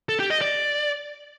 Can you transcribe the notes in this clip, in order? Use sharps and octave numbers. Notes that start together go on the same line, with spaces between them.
A4
G4
D#5
D5